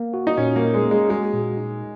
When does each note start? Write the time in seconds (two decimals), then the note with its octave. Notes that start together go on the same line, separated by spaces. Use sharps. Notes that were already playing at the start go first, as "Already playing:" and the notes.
Already playing: A#3
0.14 F#4
0.27 D#4
0.37 A#2 C#4
0.56 A#3
0.61 D#4
0.74 G#3
0.85 A#3
0.91 G#3
1.09 G#3 F#4
1.34 A#2
1.57 D#4